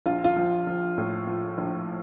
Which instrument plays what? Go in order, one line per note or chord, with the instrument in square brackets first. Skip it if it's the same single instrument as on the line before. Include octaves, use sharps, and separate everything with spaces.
[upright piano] A#1 F4
F4
F3
F3
A2
F3
A#1